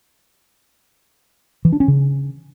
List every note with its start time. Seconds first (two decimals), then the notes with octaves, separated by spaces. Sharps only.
1.65 E3
1.72 D4
1.80 C#4
1.88 C#3